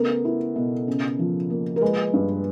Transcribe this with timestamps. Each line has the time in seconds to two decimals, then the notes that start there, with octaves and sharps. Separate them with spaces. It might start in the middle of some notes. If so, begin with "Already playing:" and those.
Already playing: C#3 A3 B3 A#4
0.25 E4
0.56 B2
0.88 C#3
1.19 F3
1.50 A#3
1.76 A#4
1.81 G#3 B4
2.14 G2